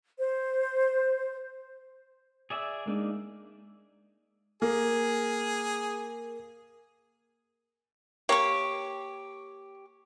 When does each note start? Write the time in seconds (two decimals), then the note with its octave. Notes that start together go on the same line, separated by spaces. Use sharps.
0.18 C5
2.50 G#4 D5 E5
2.86 G#3 A#3 D4 D#4
4.62 A#3 G#4
8.29 A#3 G4 C#5 C#6